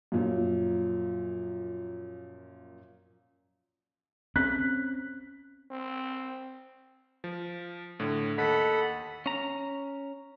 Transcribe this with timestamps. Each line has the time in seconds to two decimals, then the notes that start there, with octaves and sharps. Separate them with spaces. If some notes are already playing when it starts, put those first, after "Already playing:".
0.12 F#2 A#2 F3
4.36 C4 C#4 F#6 B6
5.71 C4
7.24 F3
8.00 A2 D3
8.38 D#2 A4 D#5 F#5 B5 B6
9.26 C#4 A#5